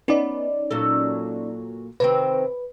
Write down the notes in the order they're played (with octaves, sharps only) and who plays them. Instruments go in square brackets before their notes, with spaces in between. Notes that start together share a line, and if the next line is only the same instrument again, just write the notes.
[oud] B3 [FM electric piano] C#4 D#4 D5
[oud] A#2 F#3 A4
[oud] C3 D#3 C4 [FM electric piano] B4